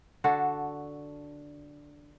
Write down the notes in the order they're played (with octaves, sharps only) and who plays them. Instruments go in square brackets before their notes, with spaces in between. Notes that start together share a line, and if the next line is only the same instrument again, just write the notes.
[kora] D3 D4 F#4 A4